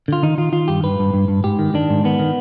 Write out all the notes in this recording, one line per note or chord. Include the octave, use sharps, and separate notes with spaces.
D3 F4
D#3 D#4
D#3 F4
D#3 F4
G2 G4
G2 B4
G2
G2
G2
G#2 G4
D#3
D#3 D4
G#2
D#3 B3
D#3